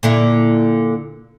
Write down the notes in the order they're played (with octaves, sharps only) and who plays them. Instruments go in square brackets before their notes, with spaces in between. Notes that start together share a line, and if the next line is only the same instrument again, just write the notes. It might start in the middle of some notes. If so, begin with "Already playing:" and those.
[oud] A#2 D3 E4